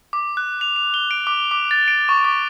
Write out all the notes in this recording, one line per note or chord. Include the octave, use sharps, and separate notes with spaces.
D6
F#6
F7
F7
G7
D7
D6
D6
A6
D7
C#6
D6